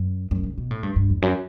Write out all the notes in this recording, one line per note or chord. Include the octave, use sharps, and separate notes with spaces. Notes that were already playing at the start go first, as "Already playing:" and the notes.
Already playing: F#2
F#2
C#3
B2
A2
G2
G2
E2
F#2